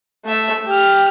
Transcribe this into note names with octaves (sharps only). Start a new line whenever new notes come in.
A3 E5
G4 F6